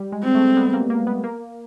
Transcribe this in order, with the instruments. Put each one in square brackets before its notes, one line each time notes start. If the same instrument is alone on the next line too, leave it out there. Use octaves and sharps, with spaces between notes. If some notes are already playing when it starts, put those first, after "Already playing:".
Already playing: [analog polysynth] G3
G#3
[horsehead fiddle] C4
[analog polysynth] A3
B3
A#3
A#3
B3
A#3